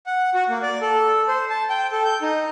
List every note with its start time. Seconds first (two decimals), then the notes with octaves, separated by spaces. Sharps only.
0.06 F#5
0.34 F#4
0.49 A#3
0.63 D5
0.81 A4
1.28 C5
1.50 A5
1.70 G5
1.92 A4
2.05 G6
2.22 D#4